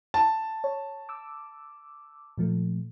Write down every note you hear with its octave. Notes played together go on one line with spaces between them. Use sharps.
A5
C#5
D6 E6
A#2 F3 A3